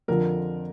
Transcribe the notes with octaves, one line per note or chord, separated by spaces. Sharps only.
F2 D3 F3 A#4